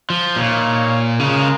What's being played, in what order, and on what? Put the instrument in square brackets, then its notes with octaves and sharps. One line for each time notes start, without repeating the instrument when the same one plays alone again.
[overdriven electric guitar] F3
[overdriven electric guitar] A#2 [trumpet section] D#4 C#5 F5
[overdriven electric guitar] C#3 [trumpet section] G#3 F4 A#4